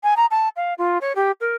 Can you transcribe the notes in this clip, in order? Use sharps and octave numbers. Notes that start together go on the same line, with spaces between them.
G#5
A#5
A5
F5
F4
C#5
G4
A#4